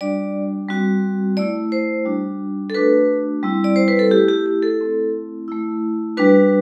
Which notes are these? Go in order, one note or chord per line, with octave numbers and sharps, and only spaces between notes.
G3 D4 F#4 D5
G3 C4 F#4
A3 E4 D5
C5
G3 D4 F#4
A4
A3 D4 F#4 B4
G3 C4 E4
D5
C5
B4
A4
A3 E4 G4
G4
G4
A4
A3 C4 E4
A3 E4
G3 D4 F#4 B4